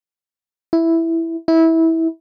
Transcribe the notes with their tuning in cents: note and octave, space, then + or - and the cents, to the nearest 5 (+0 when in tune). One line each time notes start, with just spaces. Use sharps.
E4 +0
E4 -20